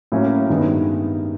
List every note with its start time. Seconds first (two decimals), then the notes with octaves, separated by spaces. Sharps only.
0.12 A2 F#3 A#3 C#4
0.50 G2 D#3 G#3 B3 D#4